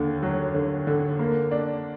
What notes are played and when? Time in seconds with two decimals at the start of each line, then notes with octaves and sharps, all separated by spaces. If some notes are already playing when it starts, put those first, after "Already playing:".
Already playing: D#2 D3
0.23 F#3
0.54 D3
0.87 D3
1.19 A#3
1.51 D4